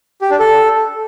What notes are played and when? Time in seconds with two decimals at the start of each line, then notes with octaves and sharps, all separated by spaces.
0.21 G4
0.30 D4
0.40 A4